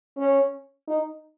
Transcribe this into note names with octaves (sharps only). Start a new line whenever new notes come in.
C#4
D#4